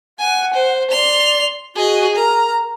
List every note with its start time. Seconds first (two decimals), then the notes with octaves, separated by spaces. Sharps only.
0.19 F#5 G#5
0.54 C5
0.91 D5 C6 F7
1.76 F#4 G#4 D#5
2.16 A#4 A#5